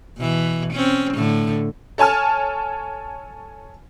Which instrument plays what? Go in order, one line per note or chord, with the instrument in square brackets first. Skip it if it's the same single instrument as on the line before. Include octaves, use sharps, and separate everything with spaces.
[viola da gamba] B2 E3
C4 C#4
A2 D3
[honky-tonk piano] A4 C#5 G#5 A5 F6